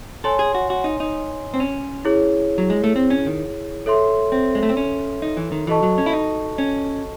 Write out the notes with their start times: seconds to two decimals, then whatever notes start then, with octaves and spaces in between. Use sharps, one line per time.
0.24 A4 C#5 G#5 C6
0.39 G#4
0.55 F#4
0.70 F#4
0.84 D#4
1.00 D#4
1.54 C4
1.60 C#4
2.05 E4 G#4 C#5
2.58 F#3
2.70 G#3
2.84 A3
2.96 C4
3.10 C#4
3.26 D#3
3.86 A4 C#5 E5 C6
4.32 C4
4.55 G#3
4.63 A3
4.69 C4
4.77 C#4
5.22 D#4
5.37 E3
5.52 D#3
5.67 E3 F#4 A4 D#5 A5 C#6
5.83 F#3
5.98 C#4
6.06 E4
6.13 D#4
6.58 C#4